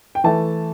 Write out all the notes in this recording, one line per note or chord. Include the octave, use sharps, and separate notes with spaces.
G5
E3 A3 E4 A5